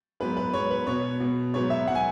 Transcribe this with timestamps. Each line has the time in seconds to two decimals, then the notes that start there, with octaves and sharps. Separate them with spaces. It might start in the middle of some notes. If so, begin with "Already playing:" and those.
0.20 G#2 F#3 B3 B4
0.37 B4
0.53 G#2 F#3 B3 C#5
0.71 B4
0.87 B2 B3 C#5
1.20 B2 B3
1.54 G#2 F#3 B3 C#5
1.70 E5
1.87 F#3 B3 F#5
1.95 G#5